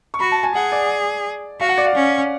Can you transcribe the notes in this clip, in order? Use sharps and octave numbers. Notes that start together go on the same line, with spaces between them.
C#6
F#4 B5
A5
G#5
G#4 F#5
D5
F#4 F5
F#5
D5
F5
C#4